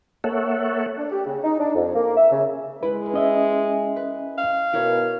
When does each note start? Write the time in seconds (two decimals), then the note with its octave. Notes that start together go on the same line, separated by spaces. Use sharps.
0.24 A#3 A4 C#5 E5 F#5
0.98 D4
1.12 G4
1.27 C#3
1.44 D#4
1.60 D4
1.75 F2
1.95 A#3
2.17 E5
2.32 C#3
2.83 G#3 E4 B4
3.14 C#4 D#5 E5
3.96 B4
4.38 F5
4.73 B2 E4 A#4 C#5